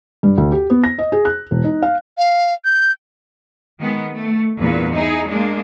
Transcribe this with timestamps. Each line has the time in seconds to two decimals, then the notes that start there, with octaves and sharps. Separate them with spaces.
0.23 G2
0.38 D2
0.52 G4
0.70 B3
0.84 A#6
0.99 D#5
1.12 G#4
1.25 F#6
1.51 E1
1.64 D#4
1.82 F5
2.18 F5
2.65 G6
3.80 D#3 G#3 B3
4.12 A3
4.57 E2 G2 A#2 B4
4.93 D#4 E4 G#4
5.28 G#3 A#3 D4